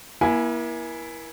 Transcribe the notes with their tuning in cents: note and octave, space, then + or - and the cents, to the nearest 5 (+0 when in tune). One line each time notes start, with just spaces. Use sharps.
A#3 +40 E4 +0 G#5 +0